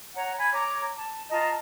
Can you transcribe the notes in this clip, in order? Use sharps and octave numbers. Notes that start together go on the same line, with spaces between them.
C#5 F#5 A#5
G#5 B5 G#6
C#5 A#5 D6
A5
F4 D#5 A5 A#5